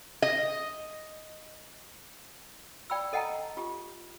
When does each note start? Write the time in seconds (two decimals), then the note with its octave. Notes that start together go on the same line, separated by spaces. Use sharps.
0.22 D#5
2.90 D5 G5 B5 E6
3.13 A4 D#5 F#5 G5 A5 A#5
3.57 F4 G4